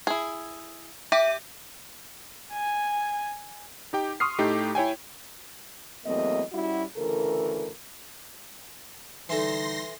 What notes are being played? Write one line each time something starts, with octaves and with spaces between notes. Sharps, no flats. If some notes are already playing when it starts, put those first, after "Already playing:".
E4 G#4
G4 E5
G#5
D#4 G4 G5
C6 C#6 D#6 F6 C7
A2 A3 D#4 G4
E4 C#5 G5 G#5
E2 F#3 A3 A#3 C4 D#5
G3 C#4 E4 F#4
D2 C#3 E3 A4 A#4
D3 E3 G3 D#4 A4 C6 A#6